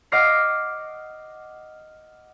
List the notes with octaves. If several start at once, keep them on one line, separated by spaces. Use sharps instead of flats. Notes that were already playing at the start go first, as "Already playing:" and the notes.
D#5 F#5 D6 F6 A#6 C7